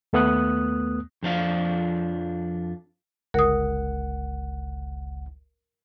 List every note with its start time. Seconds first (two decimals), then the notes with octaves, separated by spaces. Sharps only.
0.13 D#2 A3 B3 D#6 F#6
1.23 F2 F3 D4 F5
3.34 G1 C#2 A#4 F#5 D#6